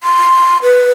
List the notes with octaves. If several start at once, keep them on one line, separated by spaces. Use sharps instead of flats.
C6
B4